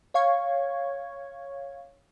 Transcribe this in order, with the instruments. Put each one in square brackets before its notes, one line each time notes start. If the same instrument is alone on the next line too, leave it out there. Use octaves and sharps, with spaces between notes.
[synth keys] C#5 F5 C#6 G#6